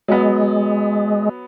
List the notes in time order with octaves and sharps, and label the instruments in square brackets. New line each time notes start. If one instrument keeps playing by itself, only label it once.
[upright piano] F#3 B3 [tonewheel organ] G#3